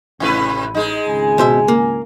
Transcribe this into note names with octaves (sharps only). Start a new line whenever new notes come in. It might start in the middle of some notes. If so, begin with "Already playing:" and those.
A1 C3 E4 B4
G#3 D#4
G#1 C#2 G#5
B2 C5 E5
A#3